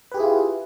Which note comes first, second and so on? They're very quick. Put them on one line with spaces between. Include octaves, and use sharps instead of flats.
B4 G4 G#4 E4 F4